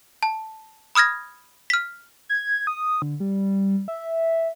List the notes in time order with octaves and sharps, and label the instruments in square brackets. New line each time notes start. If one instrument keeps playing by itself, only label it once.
[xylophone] A5
B5 D#6 F6 G#6 A#6
F6 B6
[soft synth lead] G#6
D#6
D3
G3
E5